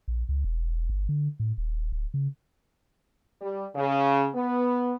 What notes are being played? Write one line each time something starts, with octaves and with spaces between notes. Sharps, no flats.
A#1
C#2
E1
G1
D3
A2
D#1
D1
C#3
G3
C#3
B3